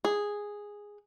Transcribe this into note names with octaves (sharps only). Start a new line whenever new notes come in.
G#4